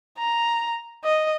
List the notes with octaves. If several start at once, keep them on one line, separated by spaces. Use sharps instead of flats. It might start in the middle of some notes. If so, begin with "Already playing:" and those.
A#5
D#5